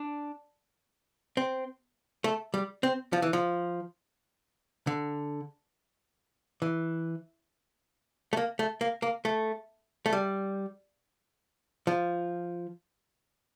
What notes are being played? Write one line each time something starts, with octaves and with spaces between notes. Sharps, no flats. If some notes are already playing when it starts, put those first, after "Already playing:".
Already playing: D4
C4
A3
G3
C4
F3
E3
F3
D3
E3
A3
A#3
A3
A#3
A#3
A3
A3
G3
F3